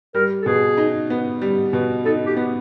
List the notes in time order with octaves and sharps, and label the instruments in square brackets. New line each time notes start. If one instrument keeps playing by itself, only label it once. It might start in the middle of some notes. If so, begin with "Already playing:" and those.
[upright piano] G3 [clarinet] A#4
[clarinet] A4
[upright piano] B2 [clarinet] G#4
[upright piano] D#4
B3
G3
B2
[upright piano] D#4 [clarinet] A4
[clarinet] G4
[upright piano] B3